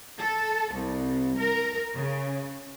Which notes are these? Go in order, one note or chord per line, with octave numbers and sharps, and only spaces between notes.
A4
C2
A#4
C#3